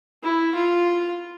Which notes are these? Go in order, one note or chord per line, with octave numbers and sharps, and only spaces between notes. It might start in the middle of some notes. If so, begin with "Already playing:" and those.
E4
F4